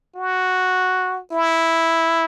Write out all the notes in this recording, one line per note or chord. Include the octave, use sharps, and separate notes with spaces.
F#4
E4